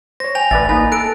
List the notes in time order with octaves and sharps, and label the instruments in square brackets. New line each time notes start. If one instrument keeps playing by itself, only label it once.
[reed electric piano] C5 C#5 [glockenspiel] A#6
[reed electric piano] G5 [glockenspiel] G#5 A#6 F7
[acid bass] A1 [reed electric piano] B4 D5 E5 [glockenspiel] A6
[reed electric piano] A#3 B4 B5 [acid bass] D#4 [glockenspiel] G#5
[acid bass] A4 [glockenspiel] F#6 D7